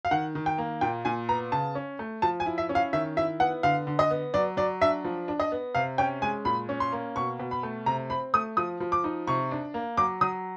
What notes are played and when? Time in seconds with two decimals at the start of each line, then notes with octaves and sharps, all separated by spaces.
0.05 F5
0.11 D#3 F#5
0.35 D#3
0.46 G5
0.58 A#3
0.81 A#2 G5
1.05 A#2 G#5
1.29 B3 A#5
1.52 C#3 A5
1.75 C#4
1.99 A3
2.22 F3 A5
2.40 G#5
2.46 E4
2.58 E5
2.69 C#4
2.75 F5
2.93 D#3 E5
3.17 E4 E5
3.40 B3 F#5
3.63 D3 F5
3.87 D3
3.99 D#5
4.11 B3
4.34 F#3 D5
4.57 F#3 D5
4.81 D4 E5
5.05 F3
5.28 D4
5.40 D#5
5.52 B3
5.75 C3 F5
5.98 C#4 G5
6.22 G#3 G#5
6.45 A#2 B5
6.69 C#4
6.80 C6
6.92 A#3
7.16 B2 C#6
7.39 B2
7.51 B5
7.63 A3
7.86 C3 A#5
8.10 C4 B5
8.34 A3 D#6
8.57 F3 D#6
8.80 F3
8.92 D6
9.04 D#4
9.27 C3 C#6
9.51 D4
9.74 A#3
9.97 F#3 D6
10.21 F#3 D#6